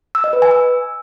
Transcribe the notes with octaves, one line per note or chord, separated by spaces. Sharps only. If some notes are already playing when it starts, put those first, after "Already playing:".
E6
D#5
B4
G#5
E6